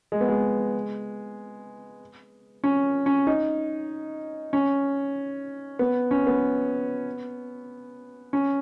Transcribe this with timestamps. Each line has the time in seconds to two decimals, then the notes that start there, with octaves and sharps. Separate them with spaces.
0.12 G#3
0.21 B3
0.29 G#3
2.64 C#4
3.06 C#4
3.27 D#4
4.53 C#4
5.79 B3
6.11 C#4
6.27 B3
8.33 C#4